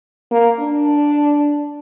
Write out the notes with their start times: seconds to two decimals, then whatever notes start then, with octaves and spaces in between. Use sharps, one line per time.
0.32 A#3
0.60 D4